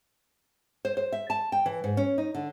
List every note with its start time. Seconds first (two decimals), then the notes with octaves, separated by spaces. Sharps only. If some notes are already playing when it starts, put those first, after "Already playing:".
0.85 C5
0.97 C5
1.12 E5
1.30 A5
1.52 G5
1.66 E3
1.84 G#2
1.97 C#4
2.18 D#4
2.35 D3